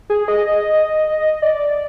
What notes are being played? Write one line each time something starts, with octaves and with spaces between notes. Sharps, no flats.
G#4
D#5
D5